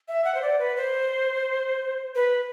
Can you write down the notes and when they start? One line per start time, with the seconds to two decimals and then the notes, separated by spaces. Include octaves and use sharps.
0.08 E5
0.25 F#5
0.35 C5
0.42 D5
0.59 B4
0.77 C5
2.15 B4